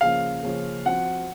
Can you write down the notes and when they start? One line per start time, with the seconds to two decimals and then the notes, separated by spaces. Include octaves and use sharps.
0.01 C#3 F3 A#3 C#4 G#4 F5
0.43 C#3 F3 A#3 C#4 G#4
0.85 F3 C4 F#4 F#5